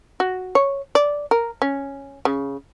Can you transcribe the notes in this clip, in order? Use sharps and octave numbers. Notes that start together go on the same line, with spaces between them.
F#4
C#5
D5
A#4
C#4
C#3